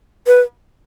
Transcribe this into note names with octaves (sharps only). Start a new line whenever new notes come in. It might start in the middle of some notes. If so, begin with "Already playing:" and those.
B4